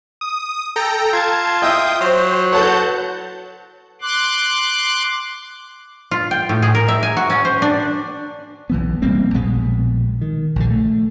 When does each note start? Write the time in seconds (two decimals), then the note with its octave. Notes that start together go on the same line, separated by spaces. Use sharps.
0.21 D#6
0.76 A4 G5 A#5
1.13 F4 A5 G#6
1.62 D#5 E5 G5 D#6
2.01 F#3 C5
2.52 A4 B4 C#5 F#5 A5 G6
4.02 C6 D6 F#6
6.11 F4
6.31 G5
6.49 A2
6.62 G#4
6.75 A#4
6.88 E5
7.03 G#5
7.17 F#4
7.30 C#4
7.45 C5
7.62 D4
8.70 B1 E3 B3
9.02 F1 G3 A#3 C4
9.34 A#1 B2 G#3 B3
10.21 D#3
10.56 A#1 D3
10.70 A3